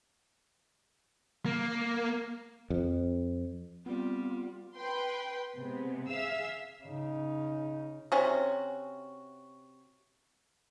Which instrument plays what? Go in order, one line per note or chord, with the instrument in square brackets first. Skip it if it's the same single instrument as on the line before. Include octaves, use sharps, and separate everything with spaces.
[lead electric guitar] A#3
[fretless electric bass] F2
[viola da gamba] G3 [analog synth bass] B3 [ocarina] C4 [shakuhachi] F4
[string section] B4 G5 C6
C3 G#3 B3
G#4 E5 F5 E6
[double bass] C#3 D#4
[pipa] C3 C#4 F#4